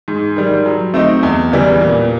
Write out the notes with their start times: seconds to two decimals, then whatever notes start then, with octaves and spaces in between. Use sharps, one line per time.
0.08 G#2
0.36 D#3 G3
0.66 F#3
0.94 A3 C4 D#4
1.23 E2
1.52 C#3 E3 G3
1.81 A#2